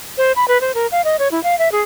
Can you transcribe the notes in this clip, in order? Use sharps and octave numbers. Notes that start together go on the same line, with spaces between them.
C5
B5
B4
C5
A#4
F5
D#5
C#5
E4
F5
E5
G#4